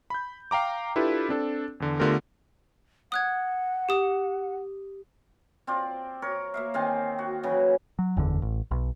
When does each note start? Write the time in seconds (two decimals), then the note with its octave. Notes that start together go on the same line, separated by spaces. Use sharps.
0.10 B5 G6
0.51 F5 G5 A#5 D6
0.96 D4 E4 F4 G4 A4 B4
1.29 C4 D4 A4
1.80 E2 D3
2.00 D3 A3 B3 F4 G4 A#4
3.12 F#5 D#6 F#6 G#6
3.89 G4 D#6
5.67 C4 F4 D5
6.22 A#4 C#5
6.54 A#3 E5 F5
6.74 D#3 C4 F5 G#5
7.19 F#4
7.43 C#3 E3 F#3
7.99 F#3
8.17 F#1 E2 D3
8.42 A1
8.71 B1